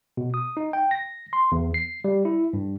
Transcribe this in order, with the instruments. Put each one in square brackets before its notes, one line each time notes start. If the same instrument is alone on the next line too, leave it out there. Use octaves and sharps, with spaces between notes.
[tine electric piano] B2
D#6
D#4
G5
A#6
C6
E2
C7
G3
E4
G2